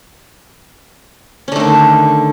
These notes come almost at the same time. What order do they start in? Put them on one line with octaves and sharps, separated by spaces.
C#4 D3 A3 D#3